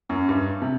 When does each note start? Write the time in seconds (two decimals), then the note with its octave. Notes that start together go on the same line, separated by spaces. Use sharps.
0.09 F#2
0.29 G2
0.62 C3